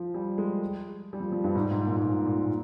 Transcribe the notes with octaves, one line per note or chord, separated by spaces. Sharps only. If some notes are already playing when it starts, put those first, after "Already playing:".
Already playing: F3
G3
G#3
G3
F3
F3
G2
G#2
G#2
A#2
G#2
A#2
A#2
A#2